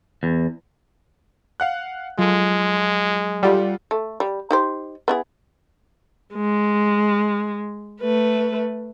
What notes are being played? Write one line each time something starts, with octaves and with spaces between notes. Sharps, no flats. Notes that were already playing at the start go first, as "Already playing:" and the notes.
E2
F5 F#5 F#6
F#3 G#3 F4 A4
G3 F4 A4 F#5
A3
G3
D#4 G4 C5
B3 E4 G#4
G#3
A3 B4